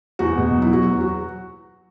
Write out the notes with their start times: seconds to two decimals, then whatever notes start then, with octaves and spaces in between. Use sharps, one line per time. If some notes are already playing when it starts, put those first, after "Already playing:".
0.19 E2 F#4
0.38 B2
0.56 F#3
0.62 E4
0.73 F#3 F#4
0.91 E2
1.01 F#4